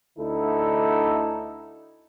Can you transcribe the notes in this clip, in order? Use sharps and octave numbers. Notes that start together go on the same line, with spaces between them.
D2 D3 D#4 E4 A4